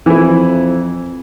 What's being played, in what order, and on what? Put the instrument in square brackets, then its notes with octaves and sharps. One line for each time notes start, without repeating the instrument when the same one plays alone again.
[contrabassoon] F2 [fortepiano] E3 E4